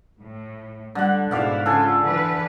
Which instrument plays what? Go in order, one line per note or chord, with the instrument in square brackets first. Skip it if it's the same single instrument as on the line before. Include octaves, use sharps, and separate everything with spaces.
[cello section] A2
[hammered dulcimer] D3 F#5 [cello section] G3
[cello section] G#2 B2 E4 [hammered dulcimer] D5 F5 F#5
[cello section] C#3 F4 [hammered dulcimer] A4 G#5
[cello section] D3 E3 B4